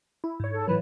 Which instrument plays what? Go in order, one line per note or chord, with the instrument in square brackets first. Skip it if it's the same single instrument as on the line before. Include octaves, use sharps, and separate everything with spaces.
[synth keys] E4
G#2 C#5
[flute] A4
[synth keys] A2 E3 F#3 [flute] B4